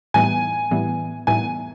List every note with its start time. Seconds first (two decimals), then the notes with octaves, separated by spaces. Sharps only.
0.14 A2 E3 G3 B3 E4 G#5
0.71 A2 E3 G3 B3 E4
1.27 A2 E3 G3 B3 E4 G#5